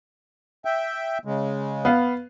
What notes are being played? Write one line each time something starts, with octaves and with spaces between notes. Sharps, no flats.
E5 G5
C#3 G#3
B3 F5